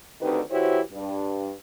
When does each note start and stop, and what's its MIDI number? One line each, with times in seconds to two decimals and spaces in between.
0.21 0.39 38
0.21 0.39 51
0.21 0.39 60
0.21 0.39 63
0.21 0.39 67
0.21 0.39 71
0.50 0.80 52
0.50 0.80 64
0.50 0.80 66
0.50 0.80 67
0.50 0.80 72
0.50 0.80 73
0.92 1.52 43